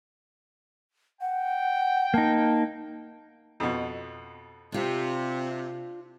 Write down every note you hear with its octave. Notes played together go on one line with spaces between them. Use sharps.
F#5 G5
A#3 D#4 A5
F2 B2
C3 D4 F4